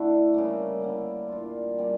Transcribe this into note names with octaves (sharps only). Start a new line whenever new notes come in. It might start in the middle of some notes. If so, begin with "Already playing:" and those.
Already playing: D3 A3 D4 E4
C#3 G3 A#3
D3 G3 A#3
A#2 G3 D4 F4
C#3 G3 A#3